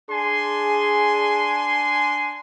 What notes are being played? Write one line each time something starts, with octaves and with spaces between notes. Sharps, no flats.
D4 G#4 G#5 C6